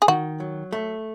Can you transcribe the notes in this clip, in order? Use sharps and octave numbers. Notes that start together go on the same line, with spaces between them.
G#4
D#3 F#4
F#3
A3